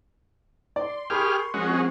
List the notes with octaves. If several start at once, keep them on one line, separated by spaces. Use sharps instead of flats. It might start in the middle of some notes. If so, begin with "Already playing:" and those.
D5 C6
G4 G#4 A#4 B5 C#6 F6
F3 G#3 C4 C#4 F#4